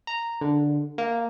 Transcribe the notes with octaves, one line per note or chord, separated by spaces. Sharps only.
A#5
D3
A#3